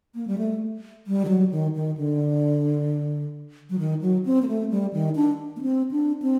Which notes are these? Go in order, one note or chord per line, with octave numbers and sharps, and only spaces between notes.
A#3
G3
A3
G3
D#3
F#3
D#3
D#3
D3
F#3
D#3
F#3
C4
A#3
A3
G3
D#3
D4
A#3
C4
D4
C4